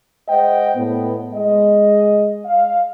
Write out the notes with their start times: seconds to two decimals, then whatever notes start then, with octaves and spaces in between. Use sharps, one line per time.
0.28 G#3 C5 D#5 F#5 G5
0.76 A2 B3
1.34 G#3 D#5
2.45 F5